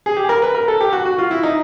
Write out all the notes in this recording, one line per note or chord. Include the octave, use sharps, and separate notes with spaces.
G#4
G4
A#4
B4
A#4
A4
G4
F#4
F#4
F4
E4
D#4